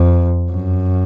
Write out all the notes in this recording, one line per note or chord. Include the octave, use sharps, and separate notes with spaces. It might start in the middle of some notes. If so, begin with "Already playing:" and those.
Already playing: F2
F#2